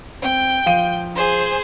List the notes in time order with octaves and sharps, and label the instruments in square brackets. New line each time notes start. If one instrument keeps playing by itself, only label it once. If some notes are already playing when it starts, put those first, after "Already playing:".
[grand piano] C4 [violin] G5
[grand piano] F3 F5 D#7
[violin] G#4 C5